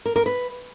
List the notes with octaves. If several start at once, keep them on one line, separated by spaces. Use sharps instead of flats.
A#4
A#4
B4